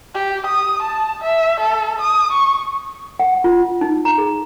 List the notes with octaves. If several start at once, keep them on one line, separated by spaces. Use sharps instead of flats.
G4
D#6
A5
E5
A4
D#6
C#6
F#5
F4
D#4
A#5
G#4